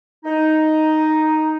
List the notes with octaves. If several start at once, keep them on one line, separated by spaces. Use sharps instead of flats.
D#4